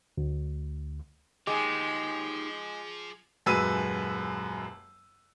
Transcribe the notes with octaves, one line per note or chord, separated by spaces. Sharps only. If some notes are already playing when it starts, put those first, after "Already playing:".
D2
F3 G#3 D#4 G4 D6
D#1 F#2 G#3 B4 E6 D#7